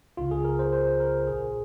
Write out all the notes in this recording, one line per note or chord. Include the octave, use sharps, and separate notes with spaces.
C#2 C#3 F4
G#4
A#4
C5
C5
A#4
A#1 A#2 G#4